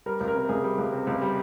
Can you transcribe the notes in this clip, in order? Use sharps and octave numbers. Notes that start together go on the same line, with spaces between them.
G3 A#4
C#2
A#4
C3
C#2 G#4
G3
C#2
C3
C#2
G3